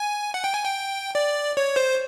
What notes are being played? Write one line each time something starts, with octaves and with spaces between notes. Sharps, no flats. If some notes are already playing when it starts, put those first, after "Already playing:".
Already playing: G#5
F#5
G5
G#5
G5
D5
C#5
C5